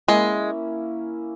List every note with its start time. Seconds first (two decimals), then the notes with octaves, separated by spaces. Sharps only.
0.08 G#3 A#3 C#4 E4